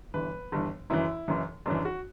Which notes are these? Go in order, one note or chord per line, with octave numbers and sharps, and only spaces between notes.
G1 G2 E3 B4
G1 G2 E3
F#1 F#2 E3 E4
F#1 F#2 E3
F#1 F#2 E3 D4
F#4